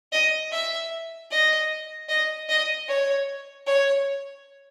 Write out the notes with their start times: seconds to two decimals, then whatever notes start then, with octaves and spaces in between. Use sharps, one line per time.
0.12 D#5
0.52 E5
1.31 D#5
2.09 D#5
2.49 D#5
2.88 C#5
3.67 C#5